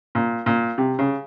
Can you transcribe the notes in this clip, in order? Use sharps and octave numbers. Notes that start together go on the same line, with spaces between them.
A#2
A#2
C3
C#3